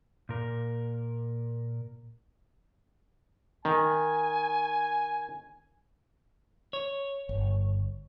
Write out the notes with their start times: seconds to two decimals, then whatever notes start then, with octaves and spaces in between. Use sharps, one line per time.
0.29 A#2 A#4
3.65 D#3 G#5
6.73 C#5
7.29 G1